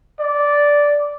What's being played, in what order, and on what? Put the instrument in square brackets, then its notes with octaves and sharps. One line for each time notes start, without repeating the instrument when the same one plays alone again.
[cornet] D5